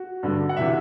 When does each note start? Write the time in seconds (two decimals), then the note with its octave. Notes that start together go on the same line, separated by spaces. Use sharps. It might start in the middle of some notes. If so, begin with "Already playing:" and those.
Already playing: F#4
0.23 G2 D3
0.49 F#5
0.57 C3 E3 E5